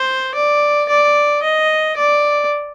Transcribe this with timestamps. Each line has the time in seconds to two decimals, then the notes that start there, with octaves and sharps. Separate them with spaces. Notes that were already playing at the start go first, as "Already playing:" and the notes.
Already playing: C5
0.35 D5
0.88 D5
1.43 D#5
1.97 D5